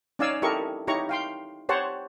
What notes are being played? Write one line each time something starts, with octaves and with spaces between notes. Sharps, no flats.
C#4 D#4 D5 F5 G#5 E6
E4 G4 A4 A#4 D#5 C#6
D#4 E4 G4 C#5 A#5 C#6
F5 G5 C6
G4 C5 C#5 F#5 A5